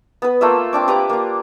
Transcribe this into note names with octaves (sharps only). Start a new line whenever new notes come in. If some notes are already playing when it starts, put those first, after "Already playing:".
B3 B4
A3 A#3 F4 E5
C4 D4 D6
G4 B4 A#5 D6
A#3 F4